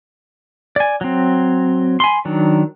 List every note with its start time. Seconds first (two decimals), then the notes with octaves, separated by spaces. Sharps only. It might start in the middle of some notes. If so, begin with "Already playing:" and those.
0.76 D5 G#5
1.01 F#3 C4
2.00 G#5 B5 C6
2.25 D#3 F#3 D4